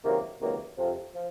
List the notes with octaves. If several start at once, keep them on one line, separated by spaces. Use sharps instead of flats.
C#2 C3 D#3 F#3 A#3
C#2 C3 D#3 F#3 A#3
F2 C3 F3
F3